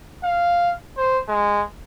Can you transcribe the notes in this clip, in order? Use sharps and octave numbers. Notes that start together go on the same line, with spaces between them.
F5
C5
G#3